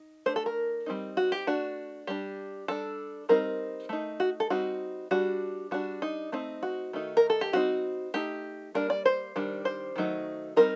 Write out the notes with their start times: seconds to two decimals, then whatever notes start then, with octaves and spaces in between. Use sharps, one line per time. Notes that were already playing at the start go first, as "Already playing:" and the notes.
Already playing: D#4
0.26 A3 D4 C5
0.36 A4
0.46 A#4
0.86 G3 C4 D#4
1.17 F#4
1.32 G4
1.47 A3 D4 F#4
2.07 G3 D4 G4
2.68 G3 D4 A4
3.29 G3 C4 D#4 A#4
3.89 A3 D#4
4.20 F#4
4.40 A4
4.50 G3 C4 D#4 F#4
5.11 G3 D4 F#4
5.71 G3 D4 F#4
6.02 D#4
6.32 A3 C4 D#4
6.63 F#4
6.93 D#3 A3 D#4
7.17 A#4
7.30 A4
7.41 G4
7.53 G3 C4 D#4 F#4
8.14 A3 D#4 G4
8.75 G3 A#3 D4 A#4
8.90 D5
9.06 C5
9.36 D#3 G3 D4
9.65 C5
9.96 D#3 F#3 A3 D#4
10.56 G3 C4 D#4 A#4